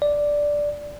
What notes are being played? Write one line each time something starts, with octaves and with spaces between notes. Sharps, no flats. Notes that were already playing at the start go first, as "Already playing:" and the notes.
D5